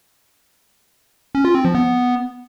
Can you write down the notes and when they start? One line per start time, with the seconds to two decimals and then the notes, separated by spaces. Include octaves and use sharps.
1.35 C#4
1.45 F4
1.55 C4
1.65 F3
1.75 B3